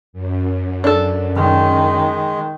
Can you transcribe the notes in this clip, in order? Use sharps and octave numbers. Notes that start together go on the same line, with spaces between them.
F#2
D4 A4
D#3 G#3